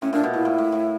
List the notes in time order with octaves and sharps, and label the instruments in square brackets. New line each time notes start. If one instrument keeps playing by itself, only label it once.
[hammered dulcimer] A2 [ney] C#4
[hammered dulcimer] A#2 [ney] D4
[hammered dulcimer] B2
[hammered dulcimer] A#2 [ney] E4
[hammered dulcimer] A2
A2
A2